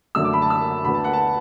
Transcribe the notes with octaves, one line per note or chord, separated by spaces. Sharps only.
F#2 D3 A3 E6
D6
B5
A5
E6
D2 D3 B3 B5
A5
F#5
A5